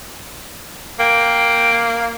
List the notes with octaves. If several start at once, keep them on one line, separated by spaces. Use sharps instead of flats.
A#3 G5